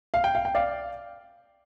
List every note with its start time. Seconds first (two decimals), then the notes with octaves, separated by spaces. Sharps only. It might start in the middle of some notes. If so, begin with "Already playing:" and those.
0.14 F5
0.24 G5
0.35 F5
0.45 G5
0.55 D5 F5